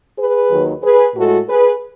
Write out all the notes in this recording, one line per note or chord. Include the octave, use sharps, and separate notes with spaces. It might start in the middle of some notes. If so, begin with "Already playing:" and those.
G#4 B4
D#2 D#3 F#3
G#4 B4
A2 G#3 F#4 A4
G#4 B4